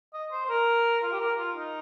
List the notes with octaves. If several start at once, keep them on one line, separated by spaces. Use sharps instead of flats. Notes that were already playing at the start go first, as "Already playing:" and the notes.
D#5
C5
C5
A#4
F4
G4
A#4
F4
D#4